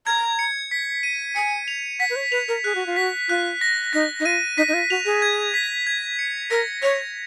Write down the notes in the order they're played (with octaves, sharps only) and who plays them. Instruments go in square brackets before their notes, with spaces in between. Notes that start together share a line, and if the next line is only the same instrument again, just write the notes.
[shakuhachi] A#5 [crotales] G#6
[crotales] C#7
B6
D#7
[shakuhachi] G#5 [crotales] C#7
[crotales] F7
[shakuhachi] F#5 [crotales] B6
[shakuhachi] B4
C#5
[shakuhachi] B4 [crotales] F7
[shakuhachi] A#4
[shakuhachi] G#4 [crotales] F#6
[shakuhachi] F#4
F4
[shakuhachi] F#4 [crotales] B6
[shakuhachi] F4 [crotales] F#6
[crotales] A#6
[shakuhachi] D#4 [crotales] A#6
[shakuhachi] D#4
[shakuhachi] F4 [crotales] D#7
[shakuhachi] D#4 [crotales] B6
[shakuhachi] D#4
F4
[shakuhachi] F#4 [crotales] F7
[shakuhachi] G#4
[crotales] G#6
B6
G#6
C#7
[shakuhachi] A#4 [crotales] A#6
[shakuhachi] C#5 [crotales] F7